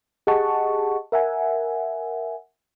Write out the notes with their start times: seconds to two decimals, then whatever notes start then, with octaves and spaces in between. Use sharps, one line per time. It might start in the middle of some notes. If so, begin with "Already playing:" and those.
0.27 G4 G#4 D#5 F#5 A5 C#6
1.12 A#4 E5 F#5 G#5